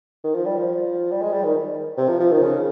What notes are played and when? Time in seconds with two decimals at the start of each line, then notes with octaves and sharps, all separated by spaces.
0.24 D#3
0.34 F3
0.46 G3
0.57 F3
1.11 G3
1.22 G#3
1.34 G3
1.44 D#3
1.98 C3
2.09 F3
2.20 F3
2.32 D#3
2.41 C#3